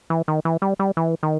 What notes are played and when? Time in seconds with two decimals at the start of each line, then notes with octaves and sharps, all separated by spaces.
0.10 E3
0.28 D#3
0.45 E3
0.62 G3
0.79 G3
0.97 E3
1.23 D#3